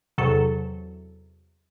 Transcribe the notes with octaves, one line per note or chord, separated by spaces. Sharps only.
E2 C3 F#3 A4